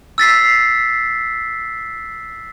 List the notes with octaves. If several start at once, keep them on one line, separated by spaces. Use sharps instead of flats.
E6 A6 B6 C7